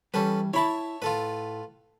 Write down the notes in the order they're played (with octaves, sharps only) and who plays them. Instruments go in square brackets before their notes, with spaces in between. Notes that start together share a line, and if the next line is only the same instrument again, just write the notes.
[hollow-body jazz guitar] E3 G3 [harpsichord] C#4 A4 B4
[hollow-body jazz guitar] E4 B5 [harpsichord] C#5 E5 A5
[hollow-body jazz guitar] A2 [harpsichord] F4 A4 B4